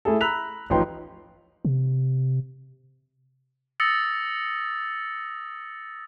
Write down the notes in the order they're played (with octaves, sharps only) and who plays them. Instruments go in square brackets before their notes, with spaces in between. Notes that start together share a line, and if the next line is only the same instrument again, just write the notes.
[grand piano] A3 E4 G#4 A4
A#5 B5 E6 F#6 B6 F7
A1 F3 D#4 G5 C6
[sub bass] C3
[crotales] D#6 E6 A6 A#6 C#7